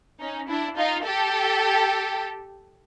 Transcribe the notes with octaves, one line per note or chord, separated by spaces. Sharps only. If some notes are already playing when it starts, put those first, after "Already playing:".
C#4 D#4
D4 E4
D#4 F4
G4 A4